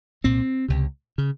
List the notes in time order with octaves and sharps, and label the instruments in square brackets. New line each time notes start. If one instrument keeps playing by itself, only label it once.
[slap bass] C2 A#2 C4
C#2 C3
C#3